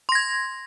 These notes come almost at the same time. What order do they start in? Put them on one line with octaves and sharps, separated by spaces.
C6 A#6 G#6